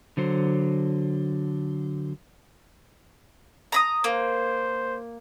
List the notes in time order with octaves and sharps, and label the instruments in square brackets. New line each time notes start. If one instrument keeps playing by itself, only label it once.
[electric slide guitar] D3 F#3 C5
[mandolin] A#5 B5 D#6
[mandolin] A#3 [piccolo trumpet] C5